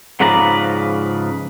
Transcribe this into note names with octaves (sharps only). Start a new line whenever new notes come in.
G#2 C#3 F3 B4 D5 A#5